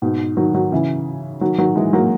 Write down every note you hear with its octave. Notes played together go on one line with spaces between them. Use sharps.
G#2 B2
D#3 F#3
D#3 F#3
C#3 E3
D#3 F#3
D#3 F#3
E3 G#3
F#3 A#3